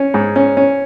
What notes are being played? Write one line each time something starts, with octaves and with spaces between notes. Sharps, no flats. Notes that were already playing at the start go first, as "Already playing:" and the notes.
Already playing: C#4
G#2
C#4
C#4